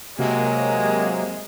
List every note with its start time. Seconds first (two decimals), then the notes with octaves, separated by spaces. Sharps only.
0.18 C3 F#3 G#3 A#3